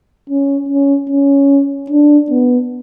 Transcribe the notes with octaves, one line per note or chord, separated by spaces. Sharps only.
C#4
C#4
C#4
D4
B3